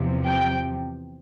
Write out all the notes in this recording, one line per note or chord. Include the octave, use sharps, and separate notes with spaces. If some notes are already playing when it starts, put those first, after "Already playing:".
Already playing: E2 C3 F3
G5